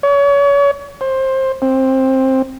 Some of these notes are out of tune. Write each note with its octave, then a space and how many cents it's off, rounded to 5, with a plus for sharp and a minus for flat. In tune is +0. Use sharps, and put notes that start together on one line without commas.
C#5 +35
C5 +20
C4 +15